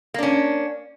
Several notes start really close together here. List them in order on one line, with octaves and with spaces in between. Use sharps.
A#3 D4 C#4